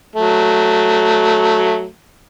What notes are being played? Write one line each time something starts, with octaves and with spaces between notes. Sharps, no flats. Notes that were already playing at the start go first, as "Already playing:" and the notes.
F#3 A3